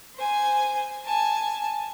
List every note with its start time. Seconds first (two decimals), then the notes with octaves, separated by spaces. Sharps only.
0.16 C5 G#5
1.04 G#5 A5